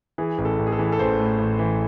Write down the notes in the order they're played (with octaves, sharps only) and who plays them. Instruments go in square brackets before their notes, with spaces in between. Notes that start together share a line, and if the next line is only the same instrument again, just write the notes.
[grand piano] E3 G#4
A1
A4
A1
G#4
A4
E3
A4
A1 C5
A2
A1
E3